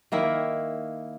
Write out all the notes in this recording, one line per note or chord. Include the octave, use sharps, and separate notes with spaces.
D#3 A#3 E4